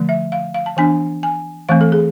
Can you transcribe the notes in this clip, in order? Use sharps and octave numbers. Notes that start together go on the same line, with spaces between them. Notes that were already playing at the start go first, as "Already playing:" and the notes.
Already playing: D3 F3 A3
E5
F5
F5
A5
E3 B3 D4 G#5
G#5
E3 A3 C4 F5
A4
G#4